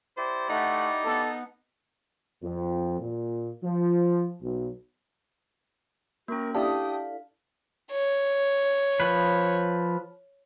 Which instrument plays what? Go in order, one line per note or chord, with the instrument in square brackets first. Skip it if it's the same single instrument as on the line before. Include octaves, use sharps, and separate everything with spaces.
[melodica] E4 G4 D5 [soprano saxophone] C5
[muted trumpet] A3 [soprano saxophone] D#4 [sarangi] F#5
[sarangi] B3 [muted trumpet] A4
[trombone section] F2
A#2
F3
B1
[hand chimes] A#3 C#4 [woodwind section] F#4 A#4
[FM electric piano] D4 E4 A4 [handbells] G4 A5 [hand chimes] F5 [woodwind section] G5 D#6
[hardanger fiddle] C#5
[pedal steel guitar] F3 B4